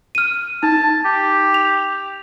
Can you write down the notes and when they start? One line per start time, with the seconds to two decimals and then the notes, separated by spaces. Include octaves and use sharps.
0.15 F6 D#7
0.63 D#4 A5
1.05 G4
1.54 F7